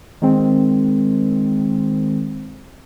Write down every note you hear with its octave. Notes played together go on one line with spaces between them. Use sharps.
D#3 G#3 C4